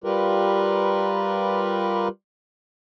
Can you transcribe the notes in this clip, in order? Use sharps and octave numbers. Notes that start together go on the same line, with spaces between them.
G3 F4 G4 A#4 B4